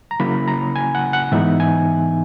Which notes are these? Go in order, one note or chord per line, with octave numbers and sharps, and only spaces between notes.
A#5
C#3 F#3 A#3 C#4 E4 B5
A#5
G#5
F#5
F#5
G#2 E3 B3 D#4 E5
G#5